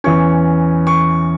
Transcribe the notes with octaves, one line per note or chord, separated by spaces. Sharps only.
E2 E3 C#4 C#6
C#6